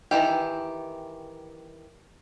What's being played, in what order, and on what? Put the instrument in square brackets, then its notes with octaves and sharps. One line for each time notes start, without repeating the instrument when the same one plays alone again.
[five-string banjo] D#3 E3 G4